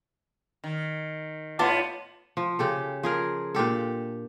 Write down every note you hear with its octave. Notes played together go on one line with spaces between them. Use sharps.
D#3
A2 B3 F4 A5 D6
F3
C#3 G4 A4
F3 G#4 A#4
A#2 D4 G4 A4